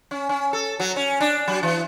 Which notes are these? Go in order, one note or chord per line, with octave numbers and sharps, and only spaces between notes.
C#4
C#4
A4
F#3
C#4
D4
F#3
E3